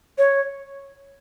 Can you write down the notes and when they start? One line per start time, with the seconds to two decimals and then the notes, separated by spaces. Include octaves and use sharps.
0.18 C#5